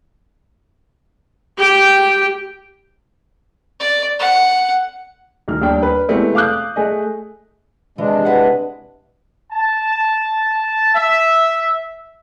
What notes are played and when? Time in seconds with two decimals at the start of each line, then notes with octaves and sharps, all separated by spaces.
1.58 G4 G5
3.80 D5
4.19 F#5
5.48 D2 D#3 F6
5.61 D#2 G3 D4 G5
5.83 B4
6.09 C3 E3 G#3 A3 B3 C4
6.35 F5 D6 D#6 F#6 G6
6.76 A3 G#4 D#5
7.98 C3 E3 G#3 D4
8.25 E4 B4 F#5
9.52 A5
10.95 E5